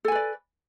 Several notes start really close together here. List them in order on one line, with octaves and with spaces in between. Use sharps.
A4 G#5 B4 D5